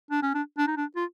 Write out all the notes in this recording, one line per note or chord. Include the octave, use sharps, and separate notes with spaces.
D4
C#4
D4
D4
D#4
D4
F4